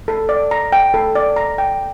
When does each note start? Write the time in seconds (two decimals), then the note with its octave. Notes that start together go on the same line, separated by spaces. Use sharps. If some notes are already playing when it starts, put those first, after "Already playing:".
0.08 A4
0.29 D5
0.51 A#5
0.72 G5
0.94 A4
1.15 D5
1.36 A#5
1.58 G5